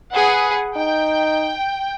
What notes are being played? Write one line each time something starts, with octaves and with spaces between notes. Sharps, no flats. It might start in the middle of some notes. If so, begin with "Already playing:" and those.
G#4 B4 F#5
D#4 G5